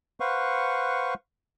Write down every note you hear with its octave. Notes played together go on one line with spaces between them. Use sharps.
B4 C5 F5 F#5 C#6